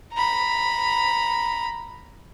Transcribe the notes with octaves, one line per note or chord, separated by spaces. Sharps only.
A#5 B5